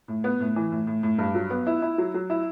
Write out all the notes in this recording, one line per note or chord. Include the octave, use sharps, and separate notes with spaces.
A2
B3
A2
E3
A2
A2
A2
G2
F#3
B3
E4
E4
F#3
F#3
E4